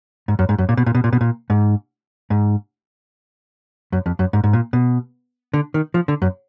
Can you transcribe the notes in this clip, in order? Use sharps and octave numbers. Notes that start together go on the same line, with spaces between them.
G#2
F#2
G#2
F#2
A#2
B2
A#2
B2
A#2
B2
A#2
G#2
G#2
F#2
F2
F#2
G#2
G#2
A#2
B2
D3
D#3
F3
D3
F#2